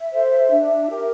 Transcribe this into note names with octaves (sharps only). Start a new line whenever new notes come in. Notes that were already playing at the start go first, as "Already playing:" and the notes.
Already playing: E5
A4 C5
D4
G4 A#4